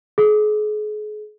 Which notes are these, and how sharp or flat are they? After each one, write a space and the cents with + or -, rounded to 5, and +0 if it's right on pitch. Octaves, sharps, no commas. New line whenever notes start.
G#4 +35